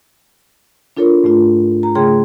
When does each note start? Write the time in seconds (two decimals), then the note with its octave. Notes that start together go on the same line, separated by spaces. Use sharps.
0.97 D4 F4 A4 A#4 C#5
1.24 G#2 A3 F4
1.83 A#5
1.95 C#3 A3 G#4 C#5 G5 C6